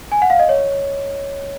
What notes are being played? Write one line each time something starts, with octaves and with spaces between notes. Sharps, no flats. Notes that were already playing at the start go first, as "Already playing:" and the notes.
G#5
F#5
F5
D#5
C#5